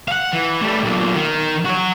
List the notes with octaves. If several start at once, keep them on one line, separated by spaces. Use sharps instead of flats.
F5 F#5
E3
G3 A3
B1 A#2
D#3
F#4 C#5